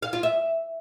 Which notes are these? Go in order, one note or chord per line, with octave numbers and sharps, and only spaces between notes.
F5
F4
E5